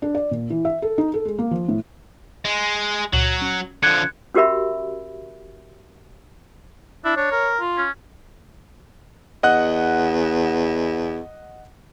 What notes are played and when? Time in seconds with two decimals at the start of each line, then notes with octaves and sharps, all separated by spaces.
0.02 D4
0.15 D5
0.31 A#2
0.50 E3
0.65 E5
0.82 A4
0.98 D#4
1.14 A4
1.25 G#3
1.39 A#3
1.51 F3
1.68 A2
2.45 G#3
3.13 C#2 A#2 F#3 F#7
3.42 C#4
3.83 D3 F3 F#6 G#6 C#7
4.34 C#4 F#4 G4 A#4 E5 B5
7.05 D4 E4
7.17 D4 C#5
7.32 A#4
7.60 F4
7.77 C#4
9.43 E2 D#5 F#5 F#6